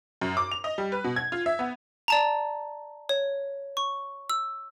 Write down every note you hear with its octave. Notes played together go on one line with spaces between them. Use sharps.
F#2
D6
F7
D#5
G3
B4
B2
G#6
F4
E5
B3
D5 A5 A#5
C#5
C#6
E6